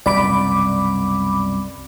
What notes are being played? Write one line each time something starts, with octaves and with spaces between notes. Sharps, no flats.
C2 F#2 B2 D5 B5 D6